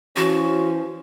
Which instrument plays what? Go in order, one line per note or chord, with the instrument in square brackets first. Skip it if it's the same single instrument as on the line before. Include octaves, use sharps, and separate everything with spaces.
[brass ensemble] E3 F3 C#4 [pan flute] F#4